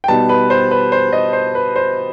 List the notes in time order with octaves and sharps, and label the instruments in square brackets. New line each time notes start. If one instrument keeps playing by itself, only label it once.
[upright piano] G5
B2 G3 B3 D#4 A5
B4
C5
B4
C5
D#5
C5
B4
C5